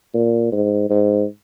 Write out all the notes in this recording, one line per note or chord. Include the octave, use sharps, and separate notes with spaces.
A#2
G#2
G#2